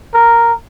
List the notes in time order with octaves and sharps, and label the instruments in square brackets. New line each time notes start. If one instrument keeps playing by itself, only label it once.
[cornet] A#4